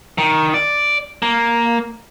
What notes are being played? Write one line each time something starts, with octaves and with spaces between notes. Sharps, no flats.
D#3
D5
A#3